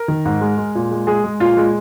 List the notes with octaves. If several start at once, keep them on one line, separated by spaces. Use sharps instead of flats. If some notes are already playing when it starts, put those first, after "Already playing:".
Already playing: A#4
D#3
G#2
G#3
G#3
A#2
G#3
G#3 G#4
G#3
A#2 F4
G#3